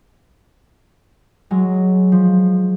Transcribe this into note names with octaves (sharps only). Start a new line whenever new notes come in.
F#3 G#3
F3